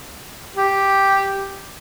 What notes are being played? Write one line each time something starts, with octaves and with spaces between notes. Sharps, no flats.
G4